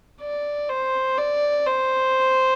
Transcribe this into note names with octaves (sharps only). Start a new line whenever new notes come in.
D5
C5
D5
C5